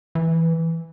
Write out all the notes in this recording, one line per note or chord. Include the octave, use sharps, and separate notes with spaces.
E3